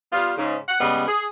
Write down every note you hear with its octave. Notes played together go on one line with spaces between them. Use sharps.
G3 B3 F4
G#2 C#3
F#5
C#3 G3 G#3 B3
G#4